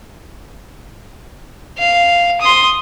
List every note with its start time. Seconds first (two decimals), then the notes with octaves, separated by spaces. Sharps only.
1.78 F5
2.41 C6 D#6